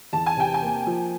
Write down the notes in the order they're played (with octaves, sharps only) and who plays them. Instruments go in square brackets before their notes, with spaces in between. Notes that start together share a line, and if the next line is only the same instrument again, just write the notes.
[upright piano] E2 [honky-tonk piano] A5
[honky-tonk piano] G#5
[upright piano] C3 [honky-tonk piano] G5
[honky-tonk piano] G#5
[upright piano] A#3
F3